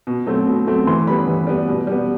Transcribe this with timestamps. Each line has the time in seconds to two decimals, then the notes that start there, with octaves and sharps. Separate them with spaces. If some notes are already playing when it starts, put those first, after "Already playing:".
0.07 B2
0.27 F#3 A3 C4
0.47 B2
0.67 F#3 A3 C4
0.87 E3 C6
1.07 G3 B3 B5
1.27 E3
1.47 G3 B3
1.68 B2
1.87 G3 B3